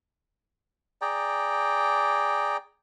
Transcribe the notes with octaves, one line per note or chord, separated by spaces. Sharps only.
G#4 D5 G5 A#5